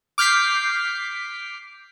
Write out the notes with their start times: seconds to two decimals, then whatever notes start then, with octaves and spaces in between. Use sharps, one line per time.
0.18 D6 F6 G6 B6 C7